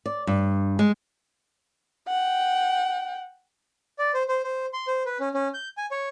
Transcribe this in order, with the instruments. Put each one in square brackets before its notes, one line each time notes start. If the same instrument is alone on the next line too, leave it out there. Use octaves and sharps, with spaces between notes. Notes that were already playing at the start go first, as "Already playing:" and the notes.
[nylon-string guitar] D5
G2
G#3
[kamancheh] F#5 G5
[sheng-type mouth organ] D5
C5
C5
C5
C6
C5
B4
C#4
C#4
G6
G#5
C#5